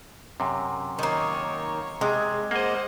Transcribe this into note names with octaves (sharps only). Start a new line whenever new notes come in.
F#2 C3
D#3 A#3 C#5
C3 G#3
A#3 C5 D#5 F#5